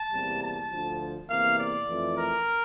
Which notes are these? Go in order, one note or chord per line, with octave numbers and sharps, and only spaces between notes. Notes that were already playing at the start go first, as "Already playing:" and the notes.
Already playing: A5
E2 C3 G3 A#3
A5
D2 D3 F3
E2 C3 E3 A#3 F5
D5
F2 E3 A3
A#4